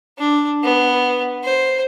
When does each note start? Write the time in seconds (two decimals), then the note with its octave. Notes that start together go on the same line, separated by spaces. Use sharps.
0.18 D4
0.63 B3
1.44 C5